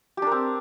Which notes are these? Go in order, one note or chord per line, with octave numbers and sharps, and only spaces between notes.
C4 D4 G4 A#4